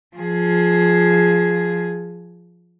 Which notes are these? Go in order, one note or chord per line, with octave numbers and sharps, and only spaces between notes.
F3 G#4